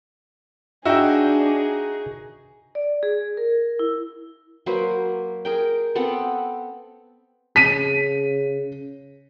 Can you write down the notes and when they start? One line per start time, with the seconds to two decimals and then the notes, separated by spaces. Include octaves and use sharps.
0.85 D4 D#4 F#4 G#4 E5 G5
2.75 D5
3.03 G#4
3.37 A#4
3.79 E4
4.66 F#3 A#3 B4 C5
5.45 G#4 A#4 G5
5.95 B3 C4 A4 F#5
7.56 C#3 B6 D#7